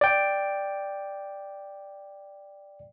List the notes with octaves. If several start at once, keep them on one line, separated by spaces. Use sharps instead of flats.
D5 G5